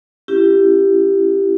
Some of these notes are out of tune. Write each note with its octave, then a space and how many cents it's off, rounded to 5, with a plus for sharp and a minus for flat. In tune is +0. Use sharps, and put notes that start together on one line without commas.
C#4 +0 E4 +30 G4 +0